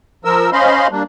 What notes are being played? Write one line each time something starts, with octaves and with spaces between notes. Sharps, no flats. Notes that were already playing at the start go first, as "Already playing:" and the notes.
F3 A#4 E6
C#4 C5 D#5 F5 B5 C6
G3 A#3 D4